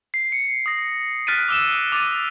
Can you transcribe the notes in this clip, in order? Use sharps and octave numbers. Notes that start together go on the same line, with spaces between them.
C7
C#7
D#6 A#6
F6 F#6 A6 B6 D7 D#7
D6 E6 E7
D6 A6 D#7